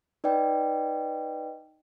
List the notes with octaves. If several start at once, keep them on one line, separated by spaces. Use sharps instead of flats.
D#4 B4 D5 D#5 G5